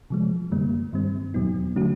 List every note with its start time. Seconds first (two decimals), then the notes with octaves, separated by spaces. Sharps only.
0.10 C3 F3 G#3
0.51 F#2 D3 G3 A#3
0.93 G2 D#3 G3 C4
1.34 E2 B2 F#3 B3 D#4
1.76 D3 F#3 A3 C#4 F#4